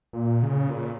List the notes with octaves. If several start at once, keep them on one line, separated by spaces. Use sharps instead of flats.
A#2
C#3
A#2